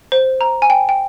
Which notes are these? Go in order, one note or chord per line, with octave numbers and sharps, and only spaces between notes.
C5
A#5
G#5
G5
G5